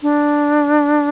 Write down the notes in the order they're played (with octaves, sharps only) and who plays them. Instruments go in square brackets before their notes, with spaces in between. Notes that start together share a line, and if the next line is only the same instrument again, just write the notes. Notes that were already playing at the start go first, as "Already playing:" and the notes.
[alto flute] D4